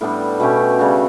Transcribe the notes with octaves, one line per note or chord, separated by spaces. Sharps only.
A2 G3 B3 D4
B2 A3 C#4 G4
C#3 G3 D4 F#4